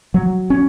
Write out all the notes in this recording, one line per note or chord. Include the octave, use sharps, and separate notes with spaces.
F#3
C#4